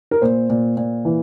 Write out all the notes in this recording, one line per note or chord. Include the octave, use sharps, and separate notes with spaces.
A#4
A#2 C5
A#2
A#2
E3